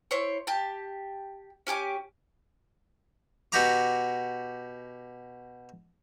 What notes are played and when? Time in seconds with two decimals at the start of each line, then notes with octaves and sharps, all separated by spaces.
0.11 E4 C5 C#5 C#6
0.47 G4 A5
1.67 C#4 G4 G#5 D6
3.52 B2 F#4 G4 G5 A#5 D6